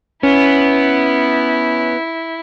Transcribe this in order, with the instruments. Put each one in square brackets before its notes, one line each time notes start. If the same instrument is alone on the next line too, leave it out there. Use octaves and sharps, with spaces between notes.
[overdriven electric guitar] B3 [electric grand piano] C#4 [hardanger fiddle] E4